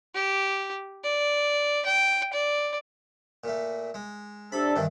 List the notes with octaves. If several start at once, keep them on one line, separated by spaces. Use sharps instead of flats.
G4
D5
G5
D5
A#2 A3
G#3
C3 D4 A4 B5
G2 D#3 E3